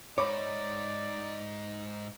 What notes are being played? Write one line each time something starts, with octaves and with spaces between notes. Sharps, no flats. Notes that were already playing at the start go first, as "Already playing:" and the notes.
G#2 D#4 C#5 D5 B5 D6